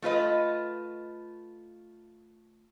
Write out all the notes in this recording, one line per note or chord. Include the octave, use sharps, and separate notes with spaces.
A3 F4 B4 D#5